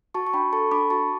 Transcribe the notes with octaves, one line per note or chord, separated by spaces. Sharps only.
F#4 A5 C#6
C#6
D4 G5 B5
A4 A5 C#6
D4 B5 D6
F#4 A5 C#6